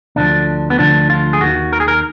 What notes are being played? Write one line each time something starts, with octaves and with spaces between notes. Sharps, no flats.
D2 D3 F3 D4
B3
D2 D3 F3 D4
F4
G#4
D#2 D#3 F#4
A#4
G#4
A#4